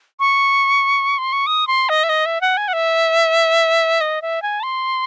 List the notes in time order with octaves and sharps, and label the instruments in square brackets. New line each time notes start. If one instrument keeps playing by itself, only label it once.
[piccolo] C#6
C6
C#6
D#6
C6
D#5
E5
D#5
E5
F#5
G#5
F#5
E5
D#5
E5
G#5
A5
C6